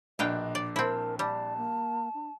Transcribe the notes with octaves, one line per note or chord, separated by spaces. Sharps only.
A#1 B2 D4 D#5 F5 G5 F#6
D5
C4 E4 A#4 A5
G3 D5 A5
A#3
D4